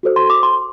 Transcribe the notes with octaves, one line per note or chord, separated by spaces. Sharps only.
F#4 A4 C5
C6
D6
C6